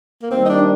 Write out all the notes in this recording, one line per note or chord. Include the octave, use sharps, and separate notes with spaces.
A#3
D#2 D#3 G3 C4
D#4
D4